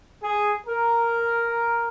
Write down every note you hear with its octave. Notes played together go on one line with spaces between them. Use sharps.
G#4
A#4